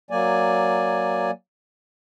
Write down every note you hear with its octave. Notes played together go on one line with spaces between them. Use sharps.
F#3 A#3 D5 G#5